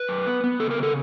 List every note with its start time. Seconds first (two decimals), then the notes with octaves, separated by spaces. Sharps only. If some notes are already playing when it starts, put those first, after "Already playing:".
Already playing: B4
0.09 F#2
0.27 B3
0.44 B3
0.60 C#3 A4
0.71 A#4
0.77 C#3
0.83 A4